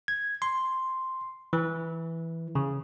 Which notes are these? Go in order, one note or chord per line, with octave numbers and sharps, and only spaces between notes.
G#6
C6
E3
C#3